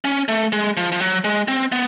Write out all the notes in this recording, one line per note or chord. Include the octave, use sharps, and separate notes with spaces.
C#4
A3
G#3
F3
F3
F#3
G#3
C4
B3